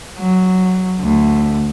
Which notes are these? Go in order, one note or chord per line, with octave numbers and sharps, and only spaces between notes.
F#3
D2